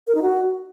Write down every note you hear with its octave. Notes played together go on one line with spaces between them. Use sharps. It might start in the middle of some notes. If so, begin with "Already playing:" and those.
A#4
D#4
F#4